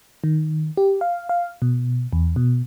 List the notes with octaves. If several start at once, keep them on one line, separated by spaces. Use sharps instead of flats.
D#3
G4
F5
F5
B2
E2
B2